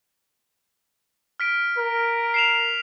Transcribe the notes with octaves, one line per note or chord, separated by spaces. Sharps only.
F6 B6 D7
A#4
C7 E7 F7